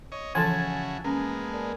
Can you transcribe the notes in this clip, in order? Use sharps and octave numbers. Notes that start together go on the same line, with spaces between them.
C#5 D#5
C#3 E3 F3 E4 F#4 A4 G#5 A5
G#3 A#3 B3 C#4
A#4 D5